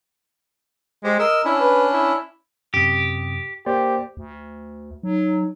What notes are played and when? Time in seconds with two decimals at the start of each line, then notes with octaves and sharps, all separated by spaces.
1.04 G#3 G4 C5
1.19 A#4 D#5 E6
1.45 C#4 D4 E4
1.60 B4
1.93 E4
2.74 F#2 C3 G4 D#6
3.66 A#3 G4 C5 D5
4.17 D2
5.03 F#3 D#4